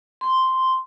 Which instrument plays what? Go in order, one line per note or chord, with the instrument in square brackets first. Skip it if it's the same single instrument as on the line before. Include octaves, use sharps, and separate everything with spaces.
[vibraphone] C6